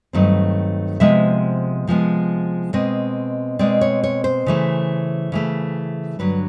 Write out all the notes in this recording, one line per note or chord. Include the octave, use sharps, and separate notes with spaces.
G2 D#3 F#3 A3 C4
C3 F3 G#3 B3 E5
C3 F3 G#3 B3
B2 G#3 C4 D#5
B2 G#3 C4 D5
C#5
C#5
C5
C#3 E3 A3
C#3 E3 A3
G2 D3 F#3 B4